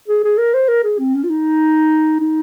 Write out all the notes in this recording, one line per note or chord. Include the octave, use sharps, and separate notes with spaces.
G#4
G#4
A#4
C5
A#4
G#4
C4
C#4
F4
D#4
D#4